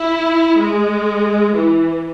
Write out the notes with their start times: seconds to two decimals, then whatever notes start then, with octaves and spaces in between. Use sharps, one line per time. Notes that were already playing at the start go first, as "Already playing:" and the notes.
Already playing: E4
0.59 G#3
1.55 E3